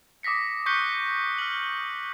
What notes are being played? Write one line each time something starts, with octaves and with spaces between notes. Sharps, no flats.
D6 D#6 A#6 B6 C#7
C#6 F#6 G6 B6 C#7 G7
F6 F#7